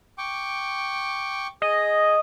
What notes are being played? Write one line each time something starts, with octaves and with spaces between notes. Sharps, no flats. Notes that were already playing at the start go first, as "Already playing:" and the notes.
G5 C#6 D6
G#4 D#5